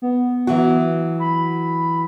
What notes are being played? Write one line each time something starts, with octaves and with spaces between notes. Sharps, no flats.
B3
E3 F#3 F#4
B5